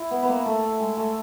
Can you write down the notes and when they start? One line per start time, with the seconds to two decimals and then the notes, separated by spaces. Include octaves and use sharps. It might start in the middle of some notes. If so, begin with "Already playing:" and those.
Already playing: E4
0.11 B3
0.22 B3
0.28 A#3
0.46 A3
0.80 G#3
0.97 A3